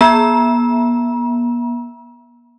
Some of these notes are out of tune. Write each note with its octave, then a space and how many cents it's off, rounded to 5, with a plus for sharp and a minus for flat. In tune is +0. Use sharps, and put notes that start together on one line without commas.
B3 -45 A#5 +45